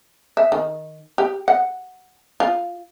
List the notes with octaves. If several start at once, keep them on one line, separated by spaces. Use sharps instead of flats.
E5
D#3
G4
F#5
F4